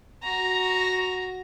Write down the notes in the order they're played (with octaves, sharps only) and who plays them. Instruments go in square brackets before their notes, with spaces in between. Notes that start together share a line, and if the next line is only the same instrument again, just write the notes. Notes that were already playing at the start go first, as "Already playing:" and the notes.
[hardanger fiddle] F#4 A#5